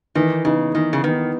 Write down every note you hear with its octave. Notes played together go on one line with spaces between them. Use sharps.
D#3 E3
C#3 B3 D#4
D#3 E3
C#3
D#3 B3 D#4